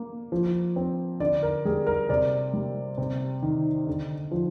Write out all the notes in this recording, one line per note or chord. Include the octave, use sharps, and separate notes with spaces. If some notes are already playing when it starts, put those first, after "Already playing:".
Already playing: A#3
F3
C4
D3 D5
A#4
G3 G#4
A#4
C3 D5
G3
C3
D#3
D3
F3